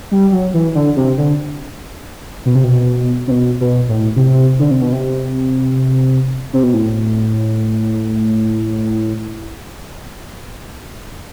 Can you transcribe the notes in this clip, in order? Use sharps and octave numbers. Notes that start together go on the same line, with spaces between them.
G3
F#3
E3
D3
C3
D3
B2
C3
B2
C3
B2
B2
A2
C3
D3
C3
B2
C3
C3
B2
A2